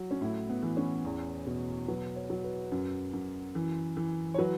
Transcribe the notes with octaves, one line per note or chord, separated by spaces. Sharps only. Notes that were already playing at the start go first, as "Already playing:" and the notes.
Already playing: F#3
C#4
A2 E4
B3
E3
C#4
E2
B2
F#3 B4
C#5
F#3
B4
F#2
F#2
E3
E3
C#5
F#3 B4